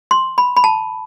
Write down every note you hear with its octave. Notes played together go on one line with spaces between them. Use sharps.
C6
B5
B5
A5